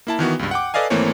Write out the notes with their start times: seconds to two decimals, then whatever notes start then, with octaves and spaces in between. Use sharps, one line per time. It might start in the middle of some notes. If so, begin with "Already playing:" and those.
0.07 A#3 E4 A5
0.19 D#3 E3 B3 F#4
0.39 C#2 G2
0.51 F#5 G5 D6
0.74 A4 B4 D5 D#5 F5 G#5
0.90 G#1 E3 A3 A#3 C4 C#5